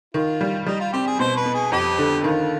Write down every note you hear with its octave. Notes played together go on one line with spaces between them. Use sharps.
D#3 F4
G3
G3 D#4
F4
C4 G4
G#4
B2 C5
B4
B3
G#4
F2 G4
D3
D#3 F4